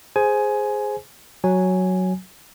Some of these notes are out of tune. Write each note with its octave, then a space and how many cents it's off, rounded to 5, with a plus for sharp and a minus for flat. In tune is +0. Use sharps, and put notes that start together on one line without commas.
G#4 +0 C5 +0 G#5 +15
F#3 +0 G#5 +0